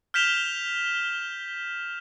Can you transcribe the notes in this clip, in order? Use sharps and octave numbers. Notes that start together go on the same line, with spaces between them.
F6 G6 B6 E7 F7 G7